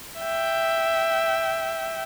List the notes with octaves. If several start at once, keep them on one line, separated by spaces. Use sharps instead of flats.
E5 G5